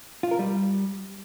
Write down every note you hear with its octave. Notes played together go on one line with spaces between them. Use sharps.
F4
A#4
G3